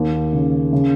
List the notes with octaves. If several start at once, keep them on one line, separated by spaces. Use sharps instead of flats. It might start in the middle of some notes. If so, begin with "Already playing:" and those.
Already playing: D#2
C#3
C#3